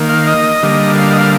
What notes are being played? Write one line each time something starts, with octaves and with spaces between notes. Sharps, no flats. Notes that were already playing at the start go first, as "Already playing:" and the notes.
Already playing: D#3 A#3
F5
D#5
D3 G3 A#3
F5
D#5
F5